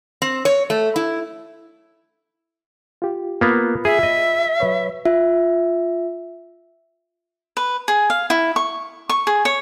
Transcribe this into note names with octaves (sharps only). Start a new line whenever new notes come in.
C4
C#5
A3
E4
F4 G4
A#3 B3 F4 B5
G#4 E5
D#5
F#3 B4 C#5
F4 E5
B4
G#4
F5
E4
C#6
C#6
G#4
C#5